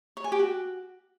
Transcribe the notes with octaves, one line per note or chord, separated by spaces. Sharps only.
C#5
G#5
G4
F#4